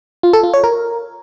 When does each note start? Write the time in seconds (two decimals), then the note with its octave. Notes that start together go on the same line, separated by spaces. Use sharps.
0.23 F4
0.33 A4
0.44 F4
0.54 C#5
0.64 A#4